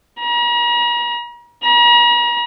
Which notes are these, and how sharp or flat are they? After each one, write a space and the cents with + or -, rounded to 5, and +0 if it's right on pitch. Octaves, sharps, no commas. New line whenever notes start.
A#5 +40
A#5 +40